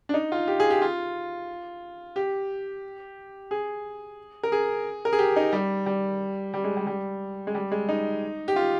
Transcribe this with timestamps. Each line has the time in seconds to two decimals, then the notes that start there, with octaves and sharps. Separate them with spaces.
0.09 D4
0.14 D#4
0.32 F4
0.48 G4
0.60 G#4
0.70 G4
0.82 F4
2.16 G4
3.51 G#4
4.43 A#4
4.52 G#4
5.05 A#4
5.13 G#4
5.19 G4
5.36 D#4
5.53 G3
5.86 G3
6.54 G3
6.64 G#3
6.77 G3
6.87 G3
7.47 G#3
7.55 G3
7.72 G#3
7.89 D#4
8.48 G4
8.56 F4